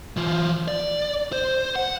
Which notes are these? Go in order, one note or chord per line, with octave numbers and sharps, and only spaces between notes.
E3 F4
D5
C5
F#5